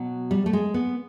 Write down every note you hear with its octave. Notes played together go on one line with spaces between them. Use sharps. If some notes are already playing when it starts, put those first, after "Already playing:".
Already playing: B2 F#3
G3
A3
G#3
B3